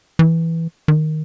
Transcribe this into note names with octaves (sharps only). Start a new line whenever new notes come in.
E3
D#3